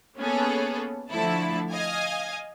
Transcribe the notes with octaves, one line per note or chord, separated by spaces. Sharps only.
A#3 B3 C#4 G#4 A4
D3 F3 A3 E4 A5
D#5 F5 G#5